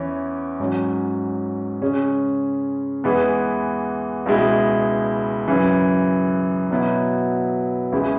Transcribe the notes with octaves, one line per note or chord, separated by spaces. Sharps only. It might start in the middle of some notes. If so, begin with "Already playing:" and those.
Already playing: E2 E3 C#4
G#2 F#3 C#4
C#3 G#3 C#4
E2 E3 G#3 B3
C#2 B2 G#3 E4
F#2 C#3 E3
B2 F#3 B3 E4
C#2 C#3 E3 G#3 E4